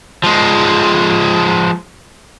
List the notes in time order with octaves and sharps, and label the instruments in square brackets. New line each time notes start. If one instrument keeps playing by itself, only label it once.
[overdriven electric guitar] F3 G#3